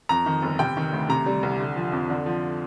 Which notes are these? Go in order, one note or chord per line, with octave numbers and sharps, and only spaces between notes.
F2 A#5
D#3
G1
C3 G5
D#3
D2
C3 A#5
G3
C2
D3
F3
F2
D3
F3